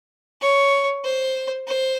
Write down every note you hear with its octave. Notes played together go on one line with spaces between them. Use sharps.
C#5
C5
C5